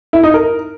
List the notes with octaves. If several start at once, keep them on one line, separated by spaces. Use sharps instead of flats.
E4
D#4
A#4